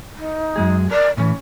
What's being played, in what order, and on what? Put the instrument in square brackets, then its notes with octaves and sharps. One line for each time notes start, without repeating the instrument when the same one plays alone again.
[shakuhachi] D#4
[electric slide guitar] F#2 G#3 G#4
[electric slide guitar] A#4 [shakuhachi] D5
[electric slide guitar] A2 E3 [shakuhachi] C#4